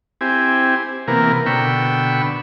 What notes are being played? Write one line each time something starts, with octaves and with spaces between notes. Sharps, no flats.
C4 E4 G4 G#5
C3 E3 A#3 B3 A#4
B2 D3 G5 B5 C#6 E6